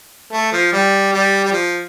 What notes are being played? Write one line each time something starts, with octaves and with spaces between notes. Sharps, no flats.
A3
F3
G3
G3
G3
F3